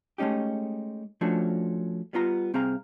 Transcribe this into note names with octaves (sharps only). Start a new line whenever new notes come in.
G#3 A3 C#4 D#4 G4
F3 A3 C#4 D4 F#4
G3 B3 F4 A#5
C2 C4 G#4 F5 A#5